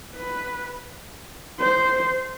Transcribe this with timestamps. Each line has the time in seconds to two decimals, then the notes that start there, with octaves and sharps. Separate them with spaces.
0.14 B4
1.60 C5